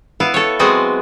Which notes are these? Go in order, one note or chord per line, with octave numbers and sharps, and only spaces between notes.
B3 E4 F5
A4 C#5
F#3 G#3 B3 C4 F#4 G#4